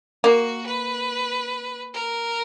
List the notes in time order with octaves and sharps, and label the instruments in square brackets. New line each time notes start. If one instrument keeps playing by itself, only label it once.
[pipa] A#3 [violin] F#4
[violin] B4
A#4